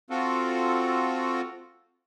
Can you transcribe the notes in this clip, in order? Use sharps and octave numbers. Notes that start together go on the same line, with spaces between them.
C4 F4 F#4 A4